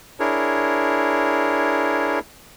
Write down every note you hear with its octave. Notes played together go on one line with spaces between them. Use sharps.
D4 E4 G#4 A#4 C#5